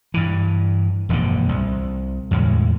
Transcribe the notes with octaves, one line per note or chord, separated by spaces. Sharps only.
G2 E3
E1 A#1 G2 D3
C2
E2 A2 D3 G#3